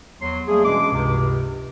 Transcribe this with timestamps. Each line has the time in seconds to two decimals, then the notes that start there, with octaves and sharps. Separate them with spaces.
0.21 E2 F#3 C6
0.48 G3 A3 A#3 G#4
0.64 B2 E3 G#3 C#4 D4 D6
0.92 C#2 G2 C3